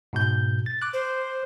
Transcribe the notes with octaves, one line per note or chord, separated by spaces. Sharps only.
G#2 B2 G6
A6
D6 F#6
C5